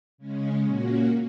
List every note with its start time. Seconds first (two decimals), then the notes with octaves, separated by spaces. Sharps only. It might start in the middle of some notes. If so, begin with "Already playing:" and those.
0.18 C#3 G#3 C#4
0.64 A#2 A#3 C#4 F#4